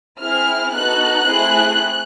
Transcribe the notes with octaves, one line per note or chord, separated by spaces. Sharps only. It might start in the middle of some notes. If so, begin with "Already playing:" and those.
C4 E4 G#4 F6
B3 D#4 F#4 A4 F#6
A3 C4 E4 G#4